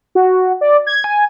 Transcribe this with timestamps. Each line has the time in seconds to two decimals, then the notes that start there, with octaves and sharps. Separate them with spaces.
0.15 F#4
0.61 D5
0.87 G#6
1.04 G#5